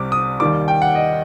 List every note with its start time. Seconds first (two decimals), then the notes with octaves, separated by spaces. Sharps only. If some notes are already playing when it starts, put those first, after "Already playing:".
Already playing: C2 C3 G3 D6
0.12 D#6
0.40 D#2 D#3 G3 D6
0.68 G5
0.82 F#5
0.95 D#5